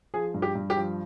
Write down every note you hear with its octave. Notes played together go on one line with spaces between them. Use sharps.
F3 G#4
G2
G4
G2
G4
F3